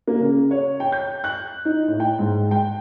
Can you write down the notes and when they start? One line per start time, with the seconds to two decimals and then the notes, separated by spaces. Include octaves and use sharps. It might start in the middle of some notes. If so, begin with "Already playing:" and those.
0.08 A#3
0.20 C#3
0.51 C#5
0.80 G5
0.92 G6
1.24 F#6
1.65 D#4
1.88 A2
2.00 G5
2.19 G#2
2.51 G5